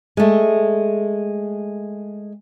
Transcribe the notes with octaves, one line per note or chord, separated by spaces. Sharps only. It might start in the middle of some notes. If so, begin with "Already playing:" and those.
G#3 A3